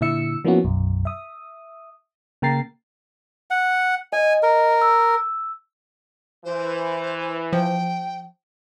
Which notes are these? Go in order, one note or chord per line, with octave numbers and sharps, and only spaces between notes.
A#2 D3 E4 E5 E6 C#7
F3 A#3 B3 C#4 E4 F#4
B1 F#2
E5 D#6
C#3 A#3 G5 A#5 A6 C7
F#5
D#5 G#5
A#4
E6
E3 C5
F3 G5